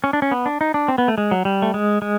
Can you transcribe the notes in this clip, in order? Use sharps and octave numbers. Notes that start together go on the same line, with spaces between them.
C#4
D4
C#4
B3
D4
D#4
D4
C4
B3
A3
G#3
F#3
G3
A3
G#3
G#3